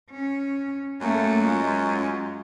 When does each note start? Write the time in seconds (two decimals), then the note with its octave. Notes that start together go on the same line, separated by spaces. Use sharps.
0.11 C#4
1.01 F#2 A3 A#3
1.43 G#3 F4